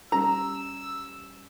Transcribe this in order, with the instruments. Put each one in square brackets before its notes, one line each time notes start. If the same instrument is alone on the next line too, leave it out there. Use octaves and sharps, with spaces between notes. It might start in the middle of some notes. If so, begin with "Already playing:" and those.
[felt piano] G3 C#4 [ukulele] A#5 [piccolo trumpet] E6